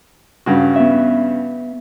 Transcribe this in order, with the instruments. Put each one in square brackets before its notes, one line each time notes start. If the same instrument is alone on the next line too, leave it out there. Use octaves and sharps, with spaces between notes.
[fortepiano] G2 C#3 F#4
[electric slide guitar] B3 E5